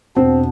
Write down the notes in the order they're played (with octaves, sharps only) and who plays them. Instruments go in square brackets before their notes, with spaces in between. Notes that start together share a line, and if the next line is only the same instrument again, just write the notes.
[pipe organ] E2 B2 B3 D4 [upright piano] C4